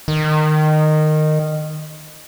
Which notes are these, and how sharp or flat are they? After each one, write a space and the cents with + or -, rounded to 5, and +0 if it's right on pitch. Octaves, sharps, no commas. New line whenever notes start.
D#3 -15